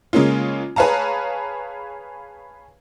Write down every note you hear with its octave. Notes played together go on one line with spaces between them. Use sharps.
C#3 G#3 A#3 C#4 F4
G#4 B4 C#5 F5 A5 A#5